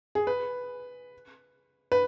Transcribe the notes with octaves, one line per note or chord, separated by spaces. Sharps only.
G#4
B4
B4